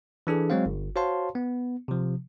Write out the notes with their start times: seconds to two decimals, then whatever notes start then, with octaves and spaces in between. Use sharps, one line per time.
0.27 E3 D4 G#4 A4
0.50 F#3 G#3 C4 C5 F5
0.66 G1
0.96 F#4 C5 C#5 F5 A5 C6
1.35 B3
1.88 C3 F3